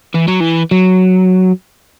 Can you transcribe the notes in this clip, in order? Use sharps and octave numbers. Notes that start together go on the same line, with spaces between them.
E3
F#3
E3
F#3